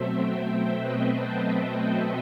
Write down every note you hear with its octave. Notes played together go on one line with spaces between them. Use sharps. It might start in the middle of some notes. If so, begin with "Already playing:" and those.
Already playing: B2 F#3 A3 C4 C5 E5
E5 G5
E5 G5
B4 D#5
A4 C5